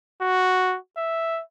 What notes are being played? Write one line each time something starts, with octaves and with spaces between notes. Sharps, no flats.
F#4
E5